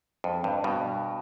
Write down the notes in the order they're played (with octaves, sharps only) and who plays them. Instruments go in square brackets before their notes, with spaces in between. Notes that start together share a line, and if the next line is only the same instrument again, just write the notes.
[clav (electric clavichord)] F2
G2
G2 B2